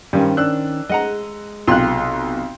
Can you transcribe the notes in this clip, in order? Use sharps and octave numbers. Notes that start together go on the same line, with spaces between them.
G2 D#3 G3 C#4 C5
D4 E6 F#6
G#3 D#5 F#5 A#5
B1 C3 F4 G5 C6 F#6